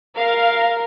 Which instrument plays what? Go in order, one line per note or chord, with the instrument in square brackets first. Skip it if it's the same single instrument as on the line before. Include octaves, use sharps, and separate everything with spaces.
[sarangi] A#4 [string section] F5